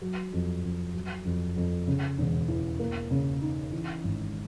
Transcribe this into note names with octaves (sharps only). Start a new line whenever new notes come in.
F#3
F2
F2
F#3
F2
F2
C#3
E1
E3
A#3
C#3
D#4
E3
G#1